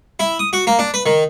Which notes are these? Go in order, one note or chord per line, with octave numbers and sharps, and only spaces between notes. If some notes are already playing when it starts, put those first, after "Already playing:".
E4
D#6
F#4
A#3
D4
B4
D#3